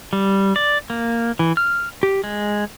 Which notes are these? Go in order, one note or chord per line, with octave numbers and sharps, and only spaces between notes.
G3
D5
A#3
E3
F6
G4
G#3